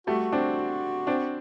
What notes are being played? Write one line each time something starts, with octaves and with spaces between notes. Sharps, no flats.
G3 A3 F#4
C4 D4
C4 D4